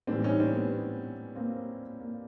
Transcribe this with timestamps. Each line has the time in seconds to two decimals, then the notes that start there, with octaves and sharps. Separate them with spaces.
0.07 A2 E3 G3 C4 D4
0.23 C#4 D#4
0.40 C4 D4
0.56 B3 C#4
1.36 A#3 C4
2.00 A#3